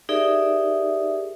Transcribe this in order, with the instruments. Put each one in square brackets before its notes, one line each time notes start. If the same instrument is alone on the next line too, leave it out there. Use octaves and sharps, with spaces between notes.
[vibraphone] D#4 G4 G#4 A#4 D5 E5